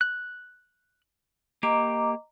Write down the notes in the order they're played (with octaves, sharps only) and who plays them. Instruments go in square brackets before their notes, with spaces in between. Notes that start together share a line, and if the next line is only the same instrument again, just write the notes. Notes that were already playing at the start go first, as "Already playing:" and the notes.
[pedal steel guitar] F#6
[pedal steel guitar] A#3 G4 [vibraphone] D#5 A#5 D6